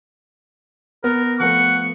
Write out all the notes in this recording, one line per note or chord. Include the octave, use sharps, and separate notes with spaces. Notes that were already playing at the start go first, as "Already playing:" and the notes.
B3 A#4
F3 A3 B3 F#5 C#6